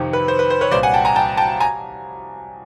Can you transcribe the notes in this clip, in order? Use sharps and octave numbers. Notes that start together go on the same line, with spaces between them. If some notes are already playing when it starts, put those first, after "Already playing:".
Already playing: F2 C3 D#3
B4
C5
B4
C5
B4 C#5
C2 A#2 C5 D5
F#5 G#5
G5 A5
G#5 A#5
G5 A5
G5 A5
G#5 A#5